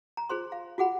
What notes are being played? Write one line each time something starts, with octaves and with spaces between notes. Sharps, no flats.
A#5
F4 G#4 C5 C6
F5
F4 F#4 G#4 F#5 B5